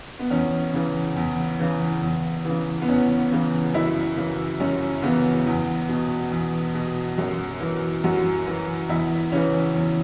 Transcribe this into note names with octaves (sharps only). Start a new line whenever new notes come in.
B3
E2 C#4
C#3 E3
E2
C#3 E3
E2
C#3 E3
B3
E2 C#4
C#3 E3
F#2 E4
C#3 E3
F#2 C#4
C#3 E3 B3
E2
B2
E2
B2
F#2
E3
F#2 F#4
E3
E2 E4
C#3 E3 C#4
E2